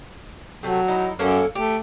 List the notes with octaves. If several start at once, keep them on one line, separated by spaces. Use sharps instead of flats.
C3 F#3 A3
D#4 E4
F#2 A#3 C#4 A4
A3 G4